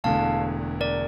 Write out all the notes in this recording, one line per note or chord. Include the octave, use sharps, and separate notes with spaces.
E1 E2 D3 A3 F5 A5
A#4 D5